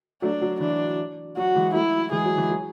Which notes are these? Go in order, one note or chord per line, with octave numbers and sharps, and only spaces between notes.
F#3 A3 D4
F#3
E3 D4
F#3 F#4
E3 G#3
F#3 A3 E4
E3 G#3 G#4
F#3
E3
F#3